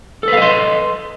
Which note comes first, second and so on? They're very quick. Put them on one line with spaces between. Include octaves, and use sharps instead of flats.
A4 B4 F5 D#5 C6